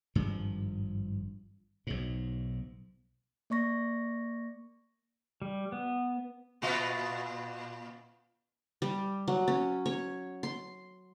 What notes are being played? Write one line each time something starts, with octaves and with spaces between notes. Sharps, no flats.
G#1 G2 F3
B1 G#2
A#3 D5 C#6 A#6
G3
B3
A#2 B3 F4
G3
F#3
C#4
C#5
C6